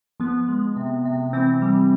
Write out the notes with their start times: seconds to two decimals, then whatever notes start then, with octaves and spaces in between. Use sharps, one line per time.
0.20 F3 B3
0.48 G#3
0.76 C3
1.05 C3
1.33 E3 C4
1.62 G3